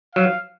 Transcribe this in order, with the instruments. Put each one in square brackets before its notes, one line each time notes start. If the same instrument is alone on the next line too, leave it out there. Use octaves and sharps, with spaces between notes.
[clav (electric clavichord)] F#3 [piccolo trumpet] F5